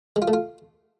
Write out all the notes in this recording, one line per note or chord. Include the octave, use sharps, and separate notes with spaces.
G#3
F4
A3
F4